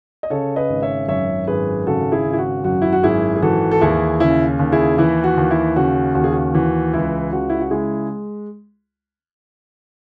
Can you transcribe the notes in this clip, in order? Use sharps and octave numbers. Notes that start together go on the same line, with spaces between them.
D#5
C#3 A4 C#5
B4 D#5
G#1
C#5 E5
F#2 C#5 E5
G#1 G#4 B4
C#3 F#4 A4
E4 G#4
G#1
E4
F#4
F#2 F#4
E4
F#4
G#1 E4 G#4
G#4
E3 F#4 A4
A4
D#2 E4 G#4
C#3 E4
D#2
E4 G#4
E3 E4
F#4
D#2
E4
C#3 F#4
D#2 F#4
G#4
F#4
E3 F#4
C#2 E4
C#3 F#4
E4
F#4
G#3 E4 G#4